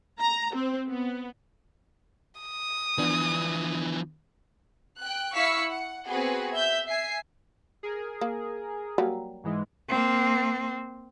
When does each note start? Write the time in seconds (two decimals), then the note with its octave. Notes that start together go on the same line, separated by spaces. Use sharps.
0.18 A#5
0.54 C4
0.88 B3
2.41 D#6
2.98 E3 F3 B3 D4
4.98 G5 F#6
5.34 E4 F5 C#6 E6 B6 C#7
5.67 F#5
6.08 B3 C4 F#4 G#4 B4
6.53 E5 G6
6.88 E5 G#5 C7
7.83 G#4 A#4
8.21 A#3
8.98 F#3 G3 A#3
9.44 G#2 E3 G#3
9.89 A#3 C4